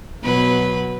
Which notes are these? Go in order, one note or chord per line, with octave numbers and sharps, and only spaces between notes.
B2 F#3 B4